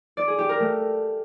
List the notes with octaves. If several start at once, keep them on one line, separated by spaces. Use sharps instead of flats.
D5
G#4
G4
A#4
A3